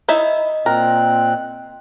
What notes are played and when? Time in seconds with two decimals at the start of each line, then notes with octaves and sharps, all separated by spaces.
0.08 D#4 E4 D#5 E5
0.66 A#2 C4 A#4 F#6